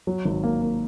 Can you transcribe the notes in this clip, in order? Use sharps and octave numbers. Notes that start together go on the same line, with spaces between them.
F#3
G#1
A#3
A#3